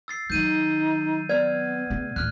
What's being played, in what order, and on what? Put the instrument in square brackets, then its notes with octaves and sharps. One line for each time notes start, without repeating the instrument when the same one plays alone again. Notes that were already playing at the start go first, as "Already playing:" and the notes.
[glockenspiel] E6 A6 C7
[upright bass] D#3 F#3 [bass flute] D#4 [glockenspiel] G6 D#7
[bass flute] B3 [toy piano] D5 [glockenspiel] F6 G#6
[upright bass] C#3 A3
[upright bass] D1 D2 [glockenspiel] F6 F#6